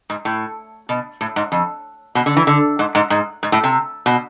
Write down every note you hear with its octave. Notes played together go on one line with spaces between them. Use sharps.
G#2
A2
B2
A2
G#2
F2
B2
D3
E3
D3
G#2
G#2
G#2
G#2
A2
C3
B2